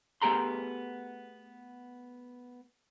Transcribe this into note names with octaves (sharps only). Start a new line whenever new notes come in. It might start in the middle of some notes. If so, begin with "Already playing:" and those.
A3 B3 G4 G#4 A#5 C6